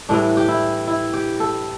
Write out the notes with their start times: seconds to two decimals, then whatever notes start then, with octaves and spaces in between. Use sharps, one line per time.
0.09 A2 E3 G3 D4
0.37 G4
0.49 E4
0.87 E4
1.14 G4
1.40 A4